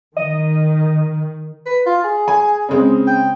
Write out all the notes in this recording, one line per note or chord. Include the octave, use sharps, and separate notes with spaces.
D#3 D#5
B4
F4
G#4
G#5
C#3 G#3 C4
G5